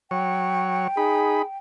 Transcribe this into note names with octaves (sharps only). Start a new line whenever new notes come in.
F#3 C#5 G5
D#4 G#4 B5